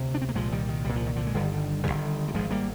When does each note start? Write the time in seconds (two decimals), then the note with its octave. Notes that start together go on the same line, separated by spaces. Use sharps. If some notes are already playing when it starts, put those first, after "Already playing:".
Already playing: D2 C3
0.15 D4
0.22 C4
0.29 A#3
0.35 C2 A#2 F3 G#3
0.52 D#3 G3
0.69 D#3
0.85 C2 A#2 G3
0.96 F3
1.06 D#3
1.16 D3 F3
1.27 G#3
1.34 G1 G2 D3 D#3 G3
1.84 G2 D3 D#3 G3
1.89 G1
2.28 G3
2.35 G#1 G#2 F3 G#3
2.50 G3 A#3